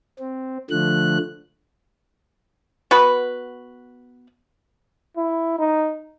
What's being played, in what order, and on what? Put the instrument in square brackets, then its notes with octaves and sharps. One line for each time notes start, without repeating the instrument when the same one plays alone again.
[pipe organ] C4
D3 F3 A3 F#6
[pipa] B3 F#4 B4
[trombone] E4
D#4